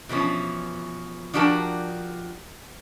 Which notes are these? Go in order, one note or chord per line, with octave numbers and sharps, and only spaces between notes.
B2 E3 F3 C#4
F3 D4 F#4 G4 A#4 A5